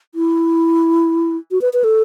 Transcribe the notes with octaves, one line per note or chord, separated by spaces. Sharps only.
E4
F#4
B4
B4
A4